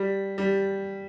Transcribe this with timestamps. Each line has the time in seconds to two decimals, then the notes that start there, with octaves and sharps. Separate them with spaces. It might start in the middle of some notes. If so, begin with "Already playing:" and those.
Already playing: G3
0.38 G3